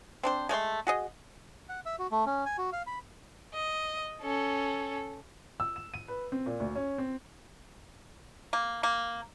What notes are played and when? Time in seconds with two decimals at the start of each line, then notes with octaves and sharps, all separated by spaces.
0.23 C4 D4 C5
0.49 G#3 A3 D5 C6
0.87 F#4 G#4 D#5
1.69 F#5
1.86 E5
1.99 F#4
2.11 A3
2.26 C#4
2.46 G#5
2.58 F#4
2.73 F5
2.87 B5
3.54 D#5
4.22 C#4 A4
5.60 E6
5.76 E7
5.94 D#7
6.08 B4
6.32 C4
6.46 A#2
6.60 D2
6.75 C#4
6.98 C4
8.53 A#3
8.83 A#3